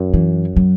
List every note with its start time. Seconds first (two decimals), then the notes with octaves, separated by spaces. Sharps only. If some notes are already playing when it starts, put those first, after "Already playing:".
Already playing: F#2
0.14 E3
0.56 F#3